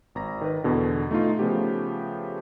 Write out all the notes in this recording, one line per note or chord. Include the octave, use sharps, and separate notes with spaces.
G#1 A#5 A#6
D#3 B4
E2 B2 D3
A3 D#4 F4
C#3 F3 A3 B3 G4